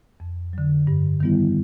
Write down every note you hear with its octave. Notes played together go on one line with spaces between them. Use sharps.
F2
D3 F#3
G2
D#3 G3 B3 E4